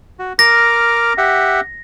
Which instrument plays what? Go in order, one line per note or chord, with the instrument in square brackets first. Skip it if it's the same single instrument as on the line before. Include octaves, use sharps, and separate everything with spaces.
[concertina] F#4
[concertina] A#4 D6 F6 [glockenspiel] A#6
[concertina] G4 E5 F#5